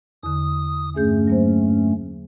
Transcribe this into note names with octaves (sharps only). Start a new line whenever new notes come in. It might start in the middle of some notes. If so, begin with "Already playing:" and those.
E2 D3 D#6
G2 A3 C#4 G#4 G6
F#3 A#3 C5